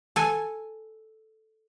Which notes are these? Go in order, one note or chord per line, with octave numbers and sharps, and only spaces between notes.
A4 G#5